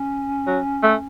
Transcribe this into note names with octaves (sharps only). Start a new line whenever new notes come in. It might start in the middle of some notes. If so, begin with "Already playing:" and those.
Already playing: C#4
F#3
A3